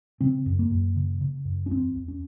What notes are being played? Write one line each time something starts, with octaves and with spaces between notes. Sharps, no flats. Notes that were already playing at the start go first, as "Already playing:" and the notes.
C#3 C4
F#2
A#3
F#2
C#3
C#3
F#2
C#4
E2 C4
E2
C#4